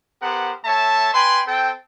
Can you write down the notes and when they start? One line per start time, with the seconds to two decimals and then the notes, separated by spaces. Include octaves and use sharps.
0.22 B3 G4 A#4 C5 F#5
0.65 A3 C#5 E5 A5
1.14 B4 G5 G#5 B5 C6
1.47 C4 A4 G5